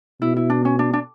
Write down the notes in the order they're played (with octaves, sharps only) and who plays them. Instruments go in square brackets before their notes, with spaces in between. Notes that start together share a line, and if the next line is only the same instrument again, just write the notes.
[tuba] B2 [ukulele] E4
[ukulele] E4
D4
C#4
D4
D4